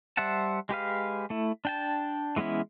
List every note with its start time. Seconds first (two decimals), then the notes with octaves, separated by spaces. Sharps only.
0.17 G3 C5 E5 F#5 A5
0.69 G#3 G4 B4 F5
1.30 A3 E4
1.65 D4 G5 A5
2.36 E3 G#3 B3 C#4 E4